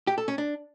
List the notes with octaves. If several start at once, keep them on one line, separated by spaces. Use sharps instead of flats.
G4
A4
C#4
D4